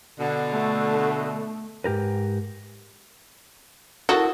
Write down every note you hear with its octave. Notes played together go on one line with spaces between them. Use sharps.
B2 D3
A3
G#2 G4 A#4 B4
E4 F#4 A4 A#4 D#6